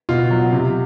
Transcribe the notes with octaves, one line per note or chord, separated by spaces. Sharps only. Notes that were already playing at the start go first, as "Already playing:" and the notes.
B2 F4
F#3
C3